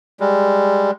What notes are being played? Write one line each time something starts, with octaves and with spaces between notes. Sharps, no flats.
G3 G#3